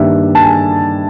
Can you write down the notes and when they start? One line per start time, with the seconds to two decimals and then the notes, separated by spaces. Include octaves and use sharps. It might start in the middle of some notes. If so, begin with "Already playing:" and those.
Already playing: G2 D#3 G3 A#3 D4 E5
0.35 A5
0.43 G#5